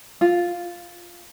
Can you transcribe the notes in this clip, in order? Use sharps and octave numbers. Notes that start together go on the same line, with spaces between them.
F4